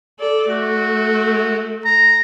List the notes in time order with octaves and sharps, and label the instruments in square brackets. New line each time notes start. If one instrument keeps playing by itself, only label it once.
[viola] A4 D5
[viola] A3 [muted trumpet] F#4
[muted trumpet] A#5